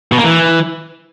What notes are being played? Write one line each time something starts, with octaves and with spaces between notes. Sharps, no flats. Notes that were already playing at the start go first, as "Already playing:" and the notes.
B2
A#3
E3